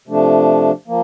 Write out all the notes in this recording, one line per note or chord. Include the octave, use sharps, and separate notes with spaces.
C3 F3 A3 D4
F3 A#3